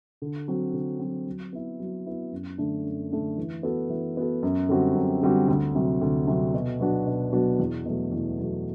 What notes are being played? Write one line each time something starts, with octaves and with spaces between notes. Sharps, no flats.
D3
F#3 C4
D3
F#3 C4
F#3
B3 E4
F#3
B3 E4
F#2
D3 A3 D4
F#2
D3 A3 D4
E3
B3 F#4 A4
E3
B3 F#4 A4
F#2
D3 G3 C4 F#4
F#2
D3 G3 C4 F#4
D2
C3 F#3
D2
C3 F#3
B2
F#3 B3 D4 F#4
B2
F#3 B3 D4 F#4
E2
B2 F#3 A3
E2
B2 F#3 A3